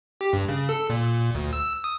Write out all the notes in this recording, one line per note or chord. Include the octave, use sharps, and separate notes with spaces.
G4
G2
C#3
A4
A#2
A#2
D2
E6
D#6